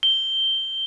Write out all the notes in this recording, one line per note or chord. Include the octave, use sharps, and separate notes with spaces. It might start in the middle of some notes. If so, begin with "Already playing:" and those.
G7